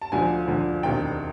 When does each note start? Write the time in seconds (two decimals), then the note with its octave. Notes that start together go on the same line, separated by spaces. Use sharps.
0.02 A5
0.12 D2 D3 F3 G#5
0.48 D2 D3 F3
0.83 E1 D2 C3 D#3 G5